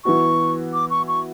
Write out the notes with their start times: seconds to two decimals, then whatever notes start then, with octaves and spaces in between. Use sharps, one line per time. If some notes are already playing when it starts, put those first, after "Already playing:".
0.04 E3 B3 F#4 C#6
0.73 D6
0.90 C#6
1.08 C#6